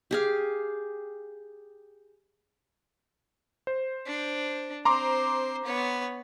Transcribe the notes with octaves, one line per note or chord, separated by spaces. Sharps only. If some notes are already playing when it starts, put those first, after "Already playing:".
G4 G#4 F5
C5
D4
C4 C5 A#5 C6 D6
B3 C#5